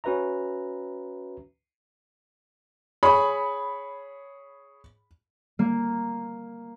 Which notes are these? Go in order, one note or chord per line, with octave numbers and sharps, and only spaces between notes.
C#4 F#4 B4 E5 A#5
G#4 C#5 B5
A#3